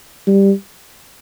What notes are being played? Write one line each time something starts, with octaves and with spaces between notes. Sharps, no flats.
G3